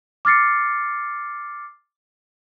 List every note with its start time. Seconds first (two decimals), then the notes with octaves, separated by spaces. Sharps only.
0.25 D6 F6 A6 C7 C#7